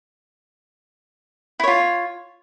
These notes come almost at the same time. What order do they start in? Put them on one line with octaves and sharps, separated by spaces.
E4 C#5 F4